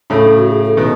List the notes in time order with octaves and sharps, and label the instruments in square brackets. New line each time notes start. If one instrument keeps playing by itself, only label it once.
[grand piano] A2 C#3 [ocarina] A4
[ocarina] F#4
G#4
A4
[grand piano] B2 D#3 [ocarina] B4